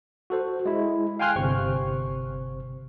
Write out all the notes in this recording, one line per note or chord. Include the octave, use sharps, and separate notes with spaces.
F#4 A4 C5
G#3 E4
F5 G5 G#5 C6 F6 F#6
G1 C3 C5 C#6